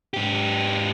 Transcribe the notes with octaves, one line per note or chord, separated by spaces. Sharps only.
G#2 G4